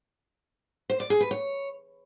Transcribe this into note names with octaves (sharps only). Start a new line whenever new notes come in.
C5
D5
G#4
B4
C#5